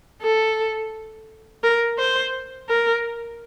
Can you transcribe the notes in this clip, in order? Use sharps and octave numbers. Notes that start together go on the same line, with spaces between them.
A4
A#4
C5
A#4